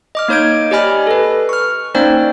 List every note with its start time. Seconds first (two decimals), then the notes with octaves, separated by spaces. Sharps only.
0.15 D#5 D6 F6
0.28 A#3 D#4 C#5 G6 G#6 D7
0.71 G4 D5 D#5 G#5 B5 F6
1.07 A4 B4
1.49 C#6 F6
1.95 A#3 C#4 D#4 C5 D5 G5